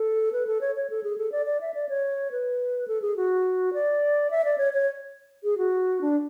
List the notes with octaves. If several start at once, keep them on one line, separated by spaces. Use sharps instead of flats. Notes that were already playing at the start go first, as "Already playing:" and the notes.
Already playing: A4
B4
A4
C#5
C#5
A4
G#4
A4
D5
D5
E5
D5
C#5
B4
A4
G#4
F#4
D5
E5
D5
C#5
C#5
G#4
F#4
D4